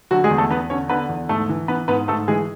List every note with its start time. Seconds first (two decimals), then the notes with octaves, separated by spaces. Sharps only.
0.11 D3 F#3 F#4
0.24 G#3 G#4
0.30 E2
0.38 A3 A4
0.51 E2 B3 B4
0.70 D3 C#4 C#5
0.89 D3 B3 B4
1.09 E2
1.29 G#2 A3 A4
1.49 E3
1.68 E3 B3 B4
1.88 G#2 B3 B4
2.08 G#2 A3 A4
2.28 E3 G#3 G#4